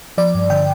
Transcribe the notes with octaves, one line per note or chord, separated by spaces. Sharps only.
F3 D5
G2
D3 G5